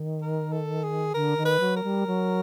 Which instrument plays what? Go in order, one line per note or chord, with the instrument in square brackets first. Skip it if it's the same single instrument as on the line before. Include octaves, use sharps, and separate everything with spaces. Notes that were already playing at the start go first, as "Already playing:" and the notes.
Already playing: [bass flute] D#3
[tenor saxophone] A#4
A4
G#4
[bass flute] D3 [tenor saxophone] A#4
[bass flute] D#3
[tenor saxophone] B4
[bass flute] F#3
[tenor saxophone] A#4
[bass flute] G3
F#3